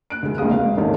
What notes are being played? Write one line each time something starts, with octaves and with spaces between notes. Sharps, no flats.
F#6 D7
D2 G#3
F#1 C#2 C#3 G#3 F5 D#6
E1 F5
E2 G#2 D#3 G#3 A3 C#4